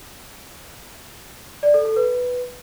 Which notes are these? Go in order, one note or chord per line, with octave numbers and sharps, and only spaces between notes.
D5
A4
A4
B4